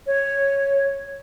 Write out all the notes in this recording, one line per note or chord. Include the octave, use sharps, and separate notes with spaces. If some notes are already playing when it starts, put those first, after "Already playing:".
C#5